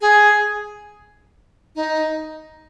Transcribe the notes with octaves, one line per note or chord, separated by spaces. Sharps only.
G#4
D#4